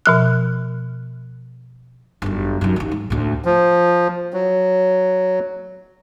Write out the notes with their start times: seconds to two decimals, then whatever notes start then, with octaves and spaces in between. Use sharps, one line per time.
0.06 B2 F3 F#6
2.22 G1 F#2
2.61 F#2 D#3
2.76 D#2 D#3
2.91 G#2
3.10 D2 A2
3.45 F3
4.33 F#3